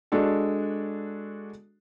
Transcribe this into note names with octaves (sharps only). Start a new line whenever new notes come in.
G#3 D4 F#4 A4